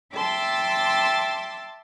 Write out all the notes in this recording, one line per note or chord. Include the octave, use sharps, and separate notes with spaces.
E5 G5 A5 C6 D6 E6